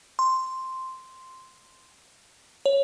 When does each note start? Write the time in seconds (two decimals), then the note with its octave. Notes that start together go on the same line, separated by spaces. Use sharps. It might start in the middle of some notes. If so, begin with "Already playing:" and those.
0.19 C6
2.66 C#5